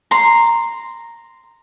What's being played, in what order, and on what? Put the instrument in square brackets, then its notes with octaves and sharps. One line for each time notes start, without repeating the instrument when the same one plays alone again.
[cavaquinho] A#5 C6